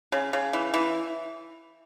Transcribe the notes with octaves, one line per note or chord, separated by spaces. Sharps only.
C#3
C#3
E3
E3